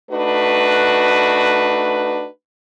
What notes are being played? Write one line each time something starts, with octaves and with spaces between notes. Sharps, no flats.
A3 D4 D#4 F#4 B4